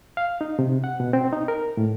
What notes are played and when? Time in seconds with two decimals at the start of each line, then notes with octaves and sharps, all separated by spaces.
0.17 F5
0.41 D#4
0.59 C3
0.84 F#5
1.00 B2
1.13 C4
1.33 D#4
1.48 A#4
1.77 A2